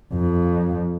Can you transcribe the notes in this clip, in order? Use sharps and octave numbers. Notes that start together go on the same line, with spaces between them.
F2